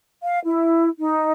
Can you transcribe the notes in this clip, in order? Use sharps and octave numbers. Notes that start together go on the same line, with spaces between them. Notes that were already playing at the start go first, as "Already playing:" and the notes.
F5
E4
D#4